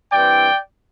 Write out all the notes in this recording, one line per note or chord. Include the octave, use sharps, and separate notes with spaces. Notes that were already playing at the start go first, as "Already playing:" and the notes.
G2 E3 C4 E4 D5 G5